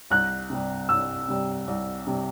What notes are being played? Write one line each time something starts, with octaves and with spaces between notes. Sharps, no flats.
C2 F#6
C3 G3
C2 E6
C3 G3
C2
C3 G3